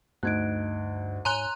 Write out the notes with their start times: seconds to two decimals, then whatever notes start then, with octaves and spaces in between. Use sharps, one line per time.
0.23 D2 G2 D#4 F#6 G#6 D7
1.25 G#2 C#5 G#5 A#5 C6 F#6 G7